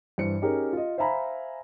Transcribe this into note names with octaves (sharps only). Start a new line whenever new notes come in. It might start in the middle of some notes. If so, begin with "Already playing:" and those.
G2 E3 E4 C5 C#7
C#4 D#4 G4 G#4 A#4
F4 D#5
C5 E5 F5 G#5 A#5 B5